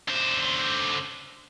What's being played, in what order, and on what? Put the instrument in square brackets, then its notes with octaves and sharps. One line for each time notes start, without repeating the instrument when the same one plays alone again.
[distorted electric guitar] D3 C5